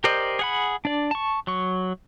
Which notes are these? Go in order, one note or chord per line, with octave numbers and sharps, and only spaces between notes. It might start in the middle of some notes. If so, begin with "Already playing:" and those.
G4 A#4 C5 D5 D#5
G#4 F#5 B5
D4 D5
A5 C#6
F#3 C#6